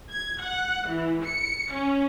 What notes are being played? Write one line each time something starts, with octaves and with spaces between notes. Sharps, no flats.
G#6
F#5
E3
C#7
C#4